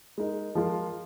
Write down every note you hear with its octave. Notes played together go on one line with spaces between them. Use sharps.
G#3 D#4 A#4
F3 G#3 F4 A#4